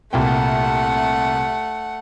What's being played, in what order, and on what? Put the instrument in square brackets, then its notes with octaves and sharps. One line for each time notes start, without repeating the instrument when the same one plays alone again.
[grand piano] C2 A#2 G5 [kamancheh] A3 F#5